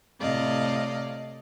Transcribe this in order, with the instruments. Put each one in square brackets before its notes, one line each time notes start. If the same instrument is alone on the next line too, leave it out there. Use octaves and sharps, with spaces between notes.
[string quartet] A2 C3 D5 D#5 F5